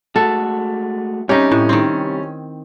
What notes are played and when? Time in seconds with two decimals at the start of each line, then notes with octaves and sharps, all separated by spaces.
0.16 G#3 A3 F#4 A4
1.29 C3 G3 C#4 D#4 G4
1.52 A2
1.69 D#3 C4